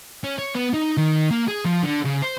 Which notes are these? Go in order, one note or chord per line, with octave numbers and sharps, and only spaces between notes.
C#4
C#5
B3
D#4
D#3
A#3
G#4
F3
D3
C#3
C5